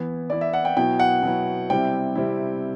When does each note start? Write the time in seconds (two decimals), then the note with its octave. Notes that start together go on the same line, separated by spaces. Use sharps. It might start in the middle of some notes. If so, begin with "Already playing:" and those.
Already playing: E3 B3 E4
0.30 E3 B3 E4 D5
0.41 E5
0.54 F#5
0.65 G5
0.76 B2 F#3 B3 E4 G5
0.99 F#5
1.23 B2 F#3 B3 E4
1.70 C3 G3 C4 E4 G5
2.16 C3 G3 C4 E4